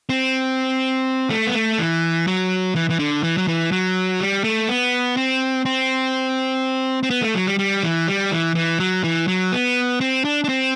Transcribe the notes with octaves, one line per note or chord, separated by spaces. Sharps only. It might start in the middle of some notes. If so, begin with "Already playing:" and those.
C4
A3
B3
A3
E3
F#3
E3
E3
D3
E3
F#3
E3
F#3
G3
A3
B3
C4
C4
C4
B3
A3
F#3
G3
G3
E3
G3
E3
E3
F#3
E3
F#3
B3
C4
D4
D4
C4